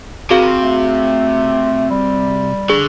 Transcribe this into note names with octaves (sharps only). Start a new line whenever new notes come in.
C3 F#4 G#4 A#4 F5
A3
G3
D3 G#4